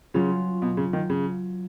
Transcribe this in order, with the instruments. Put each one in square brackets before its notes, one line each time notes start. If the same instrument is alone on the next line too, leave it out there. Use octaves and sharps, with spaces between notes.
[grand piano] C#3 [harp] F#3 C#4 F4
[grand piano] B2
C#3
D#3
C#3